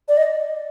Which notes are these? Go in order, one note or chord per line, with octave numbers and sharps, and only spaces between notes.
D5
D#5